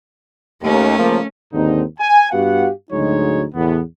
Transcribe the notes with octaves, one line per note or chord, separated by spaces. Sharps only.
D#2 A3 C#4
C#3 F3 A#3
D#2 G#2 D3 C4 D#4
G#5
G2 B3 F#4 G4 F5 F#5
D2 G#2 F#3 G#3 D#4 C#5
E2 A2 B3